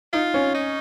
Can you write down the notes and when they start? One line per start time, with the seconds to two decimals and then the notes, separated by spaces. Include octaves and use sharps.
0.13 D#4 F4
0.34 C#4
0.54 D#4